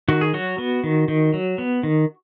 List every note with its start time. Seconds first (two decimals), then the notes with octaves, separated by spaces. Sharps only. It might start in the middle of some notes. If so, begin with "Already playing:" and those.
0.08 D#3 F#4
0.21 G#4
0.34 F#3 F#4
0.58 B3
0.84 D#3
1.08 D#3
1.34 F#3
1.58 B3
1.83 D#3